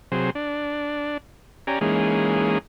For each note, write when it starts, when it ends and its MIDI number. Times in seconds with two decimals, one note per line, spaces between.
0.12 0.30 48
0.12 0.30 54
0.12 0.30 68
0.12 0.30 72
0.35 1.17 62
1.67 1.79 61
1.67 1.79 67
1.67 1.79 74
1.67 1.79 80
1.67 1.79 82
1.81 2.58 52
1.81 2.58 56
1.81 2.58 58
1.81 2.58 61
1.81 2.58 63
1.81 2.58 68